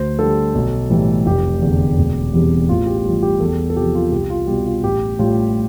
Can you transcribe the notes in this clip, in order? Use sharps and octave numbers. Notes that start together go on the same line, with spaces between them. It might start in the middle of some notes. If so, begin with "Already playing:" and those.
Already playing: D2 C5
D3 G3 A4
B1
A2 E3 G3
F1 G4
E2 D3
E1
E2 C3 E3 G3
A1 F4
G4
G4
G2 E3 F4
G4
E2 A4
A4
C3 F3 G4
F4
C2 G4
F4
B2 G3 G4
F4
A1 G4
A2 G3 F4